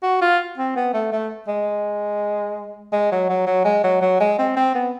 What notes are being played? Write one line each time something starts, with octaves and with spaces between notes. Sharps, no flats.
F#4
F4
C4
B3
A3
A3
G#3
G#3
F#3
F#3
F#3
G#3
F#3
F#3
G#3
C4
C4
B3